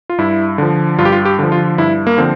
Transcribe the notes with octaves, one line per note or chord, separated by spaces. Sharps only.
F4
G2 E4
D3 F3
G2 F4
G4
F4
G4
D3 F3
F4
G2 E4
A#3
D3 F3 C4